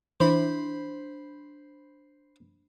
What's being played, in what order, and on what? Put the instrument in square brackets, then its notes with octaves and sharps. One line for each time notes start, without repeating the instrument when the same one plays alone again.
[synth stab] E3 E4 [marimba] D4 [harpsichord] C5 B5